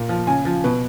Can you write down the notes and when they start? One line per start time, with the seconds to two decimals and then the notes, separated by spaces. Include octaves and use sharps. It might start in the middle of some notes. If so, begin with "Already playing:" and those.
Already playing: A#2
0.09 F3
0.27 C#3 G#5
0.45 F3
0.64 B2 B4